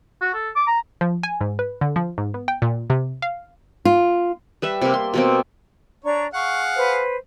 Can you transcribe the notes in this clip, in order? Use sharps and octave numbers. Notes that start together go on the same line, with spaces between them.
F#4
A4
D6
A#5
F3
G#5
G#2
B4
D3
F3
G#2
B3
G5
A#2
C3
F5
F4
G3 B4 E5
C3 A#3
C6
B2 A#3 C4
D4 C#5 D5 A#5
G#4 F5 F#5 C#6
B4 C5